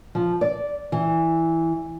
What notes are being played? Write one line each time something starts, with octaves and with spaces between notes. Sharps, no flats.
F3
D5
E3